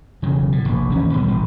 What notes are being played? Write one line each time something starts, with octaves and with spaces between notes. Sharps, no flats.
E1 C#3 F#3
A2
F1 A#1
A1 D#2 C#4
B2 G3
A1